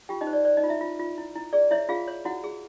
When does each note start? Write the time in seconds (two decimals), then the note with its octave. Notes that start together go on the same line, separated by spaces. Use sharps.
0.09 F4 G4 G5
0.21 D#4 D#5
0.27 C5
0.33 D5
0.45 C5 D5
0.57 D#4 D#5
0.63 F4
0.69 E4 E5
0.81 F4
1.00 F4
1.18 E4
1.36 E4
1.53 G#4 D5
1.71 E4 C#5 E5
1.89 F4 G#4 F5
2.08 C#5
2.25 E4 F#4 F#5
2.44 G#4